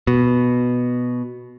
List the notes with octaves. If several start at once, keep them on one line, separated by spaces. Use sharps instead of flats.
B2